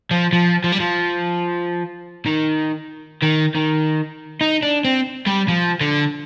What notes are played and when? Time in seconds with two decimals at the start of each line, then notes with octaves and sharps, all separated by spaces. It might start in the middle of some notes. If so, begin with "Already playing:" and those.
0.11 F3
0.33 F3
0.64 F3
0.72 G3
0.80 F3
2.26 D#3
3.23 D#3
3.55 D#3
4.41 D#4
4.62 D4
4.85 C4
5.27 G3
5.48 F3
5.81 D3